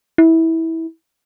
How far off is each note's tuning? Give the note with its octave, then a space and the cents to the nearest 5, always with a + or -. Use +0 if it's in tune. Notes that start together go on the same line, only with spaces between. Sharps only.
E4 -20